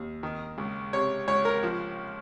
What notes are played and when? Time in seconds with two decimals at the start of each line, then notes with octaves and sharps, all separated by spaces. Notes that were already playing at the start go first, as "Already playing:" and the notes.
Already playing: D#2
0.23 D#3
0.58 C#2
0.93 C3 C#5
1.28 C#2 C#5
1.45 A#4
1.63 F3